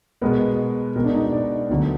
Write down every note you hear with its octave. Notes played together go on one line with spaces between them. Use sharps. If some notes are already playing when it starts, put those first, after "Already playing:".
B2 G#3 B3 A#4
B2 G#3 B3 A#4
D4
D#4
D5
D2 D3 F#3 B3